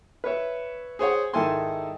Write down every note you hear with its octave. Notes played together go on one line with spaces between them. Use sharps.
B4 C#5 E5
G#4 C5 C#5 F#5
G#2 D#3 E4 A4 G#5 C6